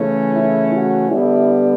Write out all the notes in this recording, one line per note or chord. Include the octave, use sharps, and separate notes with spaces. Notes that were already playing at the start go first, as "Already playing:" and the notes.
Already playing: C#3 E3 A3 C#4
E4
F#4
D3 G3 B3 E4